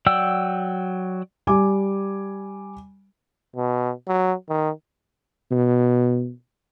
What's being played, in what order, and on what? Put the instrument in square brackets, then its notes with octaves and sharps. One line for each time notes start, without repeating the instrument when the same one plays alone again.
[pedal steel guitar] F#3 D5 F#5 G5 E6
[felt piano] G3 G#5 D6
[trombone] B2
F#3
D#3
[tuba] B2